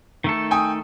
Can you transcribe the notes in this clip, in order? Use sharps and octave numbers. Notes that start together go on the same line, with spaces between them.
D#3 A3 A4
G5 G#5 D#6